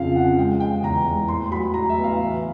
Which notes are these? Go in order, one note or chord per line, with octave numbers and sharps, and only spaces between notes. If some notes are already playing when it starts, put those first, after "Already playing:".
Already playing: F2 C#3 F3 F5
C#3 F#5
G#3 G5
G#3 G5
E2 A#5
G#3
A2 C6
F#3 B5
A2 A#5
E5
B3
F5
E3